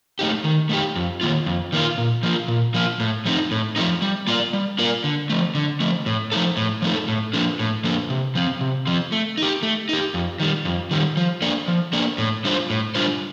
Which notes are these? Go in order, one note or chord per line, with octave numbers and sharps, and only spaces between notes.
A3 D#4 G4
D#3
A3 D#4 G4
F2
D#3 A#3 F4
F2
D#3 A#3 F4
A#2
F3 A#3 F4
A#2
F3 A#3 F4
A2
F3 A3 C4 D#4
A2
F3 A3 C4 D#4
G3
A#3 F4 A#4 D5
G3
A#3 F4 A#4 D5
D3
F3 A3
D3
F3 A3
A2
F3 A3 D#4 A4
A2
F3 A3 D#4 A4
A2
F3 A#3 D4 A4
A2
F3 A#3 D4 A4
C3
F3 C4
C3
F3 C4
A3
D#4 G4
A3
D#4 G4
F2
D#3 G3
F2
D#3 G3
F3
A#3 D4 A4 D5
F3
A#3 D4 A4 D5
A2
G3 D4 F4 C5
A2
G3 D4 F4 C5